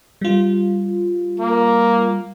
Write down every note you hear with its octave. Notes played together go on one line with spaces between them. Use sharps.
G3 F4
A#3